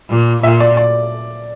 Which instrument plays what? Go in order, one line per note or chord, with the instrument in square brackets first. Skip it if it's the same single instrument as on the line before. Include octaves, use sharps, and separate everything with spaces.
[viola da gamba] A#2
[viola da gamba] A#2 [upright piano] E5
[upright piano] D5
D5